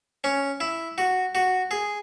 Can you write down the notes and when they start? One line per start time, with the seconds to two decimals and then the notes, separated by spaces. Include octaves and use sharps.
0.24 C#4
0.60 E4
0.98 F#4
1.35 F#4
1.71 G#4